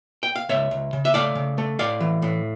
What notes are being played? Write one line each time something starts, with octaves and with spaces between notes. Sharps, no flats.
G5
F5
C#2 C#5 E5
C#2
C#3
E5
A3 D5 F5
C#3
A3
A2 D5 F5
E3
A2